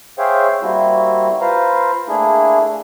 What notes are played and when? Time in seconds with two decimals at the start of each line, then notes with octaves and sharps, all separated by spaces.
0.19 G#4 C5 C#5 E5 F5 G5
0.62 G3 A#3 C4 E4 F#4
1.41 F4 B4 C5 F5 A#5
2.08 A3 A#3 D4 E4 G#4